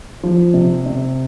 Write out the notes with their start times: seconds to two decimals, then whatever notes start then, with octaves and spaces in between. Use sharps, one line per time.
0.23 F3
0.54 C3
0.86 C3